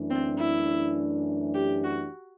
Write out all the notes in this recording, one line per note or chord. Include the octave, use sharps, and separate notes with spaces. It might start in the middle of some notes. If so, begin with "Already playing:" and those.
Already playing: F#2 E3 A3 D4
C4
E4
G4
F#4